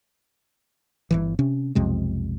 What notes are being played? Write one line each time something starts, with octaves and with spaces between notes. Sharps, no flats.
G1 C#2 E3
C3 C#4
B1 F2 C3 G#3